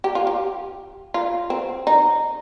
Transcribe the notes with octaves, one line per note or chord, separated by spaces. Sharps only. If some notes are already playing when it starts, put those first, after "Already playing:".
G4
F4
G4
F4
C4
D#4